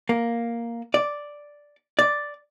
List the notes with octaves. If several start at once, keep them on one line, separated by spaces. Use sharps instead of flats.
A#3
D5
D5